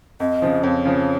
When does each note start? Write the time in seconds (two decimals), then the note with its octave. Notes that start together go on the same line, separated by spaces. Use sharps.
0.20 F2 D#5
0.42 C#3 F3
0.63 F2 C#5
0.85 C#3 F3